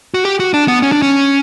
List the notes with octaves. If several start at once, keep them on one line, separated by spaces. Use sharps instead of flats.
F#4
G4
F#4
D4
B3
C#4
D4
C#4